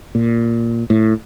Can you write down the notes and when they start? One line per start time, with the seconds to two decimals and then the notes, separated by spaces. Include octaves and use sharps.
0.15 A#2
0.90 A2